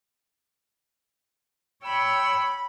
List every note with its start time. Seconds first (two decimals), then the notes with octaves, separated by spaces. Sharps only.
1.84 C#5 G5 B5 E6